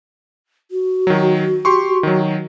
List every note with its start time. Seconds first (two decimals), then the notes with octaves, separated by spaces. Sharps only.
0.71 F#4
1.07 D#3 F#3
1.65 G4 C6 C#6
2.03 D#3 F#3